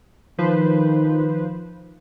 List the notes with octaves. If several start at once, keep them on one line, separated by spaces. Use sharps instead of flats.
D#3 F3 B4 C5